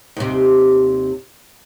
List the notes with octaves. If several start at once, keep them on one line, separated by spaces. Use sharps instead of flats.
D#2 C3